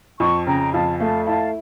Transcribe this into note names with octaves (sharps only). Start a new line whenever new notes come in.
F2 A5 C#6
C#3 G5 A#5
F2 F5 A5
A3 F5 A5
E4 F5 A5